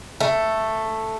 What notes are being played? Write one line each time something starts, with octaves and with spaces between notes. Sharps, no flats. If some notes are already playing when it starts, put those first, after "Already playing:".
A3